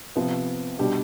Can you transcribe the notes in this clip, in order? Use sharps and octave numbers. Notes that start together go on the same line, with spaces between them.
C3 F3 B3
B2 G3 D4 G4